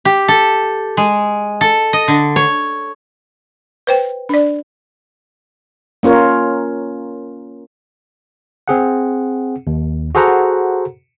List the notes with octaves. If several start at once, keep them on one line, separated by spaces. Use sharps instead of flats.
G4
A4
G#3
A4
D#5
D3
C#5
B4 C5 G5
D4 D5
A#3 C#4 F4 A#4 C#5
C4 G#4 F#5
D#2
F#4 G#4 A4 C5 F#5 A#5